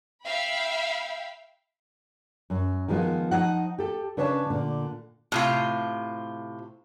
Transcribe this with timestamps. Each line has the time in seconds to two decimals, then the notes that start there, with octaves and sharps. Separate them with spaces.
0.24 E5 F5 G5 B5
2.50 F#2
2.88 D#3 F3 G#3 B3 F4
3.31 F3 D#4 F#5
3.78 G4 A4
4.17 C#3 D4 B4 C#5 E5 A5
4.50 A#2 D3
5.32 A2 C3 F4